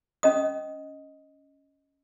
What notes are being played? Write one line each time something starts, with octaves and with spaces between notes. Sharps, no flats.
C#4 D#5 D#6